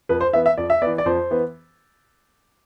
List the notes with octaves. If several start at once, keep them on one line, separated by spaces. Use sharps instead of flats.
F2 B4
C5
E3 B3 E5
E5
F2 D5
E5
E3 B3 D5
D5
F2 C5
E3 B3